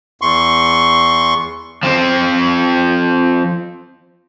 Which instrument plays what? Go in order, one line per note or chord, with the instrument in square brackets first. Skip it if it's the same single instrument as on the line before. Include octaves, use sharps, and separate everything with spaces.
[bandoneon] E2 C6 C#6
[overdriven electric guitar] F3 C4